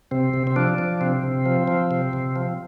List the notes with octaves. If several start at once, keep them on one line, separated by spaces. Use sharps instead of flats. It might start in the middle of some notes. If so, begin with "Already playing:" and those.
C3 C4
C3
C4
F3 D4
F3
C3 C4
C3
F3
F3
C3
C3
F3